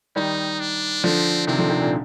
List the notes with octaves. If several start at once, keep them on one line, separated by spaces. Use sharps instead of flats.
D#3 G3 D#4
D4
D3 F3 C4
C3 D#3 C4
D3 F3
C3 D#3
A#2 D3